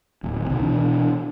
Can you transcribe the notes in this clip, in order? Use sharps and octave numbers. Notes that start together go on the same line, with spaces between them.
D1 D#2
C2 C3 D#3 C4
B2 E3 D4